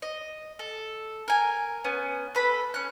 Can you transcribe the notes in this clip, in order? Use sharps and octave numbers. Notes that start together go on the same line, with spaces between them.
D#5
A4
A#4 G#5
B3 C#4
A4 B4 B5
C#4 F#6